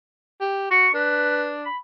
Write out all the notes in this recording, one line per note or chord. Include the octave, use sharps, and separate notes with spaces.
G4
F#4 C#6
D4 B4
B5